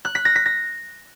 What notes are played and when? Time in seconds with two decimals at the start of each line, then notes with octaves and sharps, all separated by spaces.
0.05 F#6
0.15 B6
0.25 A#6
0.35 B6
0.46 A#6